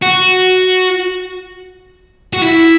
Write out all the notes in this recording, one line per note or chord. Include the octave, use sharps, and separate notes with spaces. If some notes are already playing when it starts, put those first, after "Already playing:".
F#4
F#4
E4